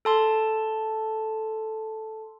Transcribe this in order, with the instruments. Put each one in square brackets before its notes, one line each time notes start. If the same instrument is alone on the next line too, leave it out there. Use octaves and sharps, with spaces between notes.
[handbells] A4 A5 C6